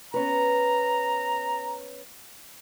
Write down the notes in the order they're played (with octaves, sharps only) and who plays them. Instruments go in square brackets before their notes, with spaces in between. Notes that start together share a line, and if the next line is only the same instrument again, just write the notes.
[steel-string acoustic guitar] B3 C#4 B4 [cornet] A#5